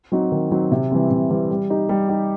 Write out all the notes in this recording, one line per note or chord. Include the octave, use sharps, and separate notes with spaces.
F#3 C4 D#4 F#4
D#3
F#3 C4 D#4 F#4
C3
E3 G3 C4
C3
E3 G3 C4
G3
D#4 G4
G3
D#4 G4